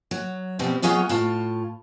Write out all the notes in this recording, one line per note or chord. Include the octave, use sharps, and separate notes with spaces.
F#3
B2 F3 G3 B3 C4
F#3 B3 F4 G#4 C#5 D#5
A2 F4 A5